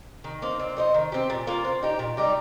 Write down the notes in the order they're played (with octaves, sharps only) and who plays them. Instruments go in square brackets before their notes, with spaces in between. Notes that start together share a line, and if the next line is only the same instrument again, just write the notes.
[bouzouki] D#3
A#3 D#4 C5
C4
D#4 C5 D#5
D#3
C4 G4
A#2
A#3 F4 A#4
C4
D#4 G4
A#2
G3 D#4 G4